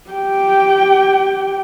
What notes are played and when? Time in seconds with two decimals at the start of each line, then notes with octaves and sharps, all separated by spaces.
0.10 G4 G5